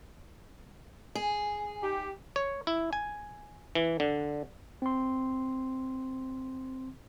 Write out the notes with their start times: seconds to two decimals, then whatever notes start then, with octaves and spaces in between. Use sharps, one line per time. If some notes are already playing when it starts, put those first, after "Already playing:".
1.15 G#4
1.82 D#4 G4
2.36 C#5
2.67 E4
2.93 G#5
3.75 E3
4.00 D3
4.82 C4 C6